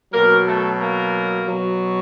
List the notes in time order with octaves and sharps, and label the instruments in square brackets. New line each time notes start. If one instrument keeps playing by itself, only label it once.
[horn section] B2 F#3 A#3 A#4
A3 A4
A#3 A#4
B2 F#3